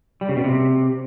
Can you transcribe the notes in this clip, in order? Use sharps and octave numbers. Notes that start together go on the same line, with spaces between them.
G3
C#3
B2
C3